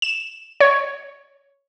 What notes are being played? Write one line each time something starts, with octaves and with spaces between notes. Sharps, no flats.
E7
C#5